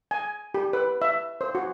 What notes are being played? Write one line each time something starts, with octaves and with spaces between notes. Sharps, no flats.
G#5
G4
B4
E5
C5
F#4